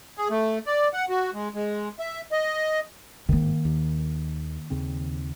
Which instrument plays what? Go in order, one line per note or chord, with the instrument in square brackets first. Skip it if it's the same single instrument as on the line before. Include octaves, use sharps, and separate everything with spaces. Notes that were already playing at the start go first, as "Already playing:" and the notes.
[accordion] G#4
A3
D5
F#5
F#4
G#3
G#3
E5
D#5
[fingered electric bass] G1 G#2 [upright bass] D#3 A#3
[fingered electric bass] D#2
D#2 C#3 C4